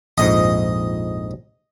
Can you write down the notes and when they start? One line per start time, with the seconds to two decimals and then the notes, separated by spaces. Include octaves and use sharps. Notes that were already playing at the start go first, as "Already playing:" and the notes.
0.18 A#1 F2 G#2 D#5